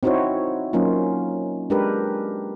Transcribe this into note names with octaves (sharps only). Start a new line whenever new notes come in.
C4 D#4 E4 F#4 C5 C#5
F#3 A#3 C#4 D#4 F4
G#3 D4 G4 A#4 B4